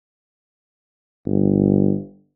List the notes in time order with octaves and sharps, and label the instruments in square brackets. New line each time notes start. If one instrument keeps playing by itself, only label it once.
[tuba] G1